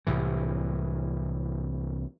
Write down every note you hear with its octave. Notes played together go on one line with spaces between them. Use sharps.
C2 A2 E3